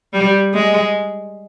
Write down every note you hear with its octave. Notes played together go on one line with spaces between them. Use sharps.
G3
G#3